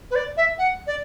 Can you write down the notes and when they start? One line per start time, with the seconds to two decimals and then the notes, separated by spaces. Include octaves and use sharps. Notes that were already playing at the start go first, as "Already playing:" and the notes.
0.10 B4
0.15 D5
0.37 E5
0.58 F#5
0.87 D5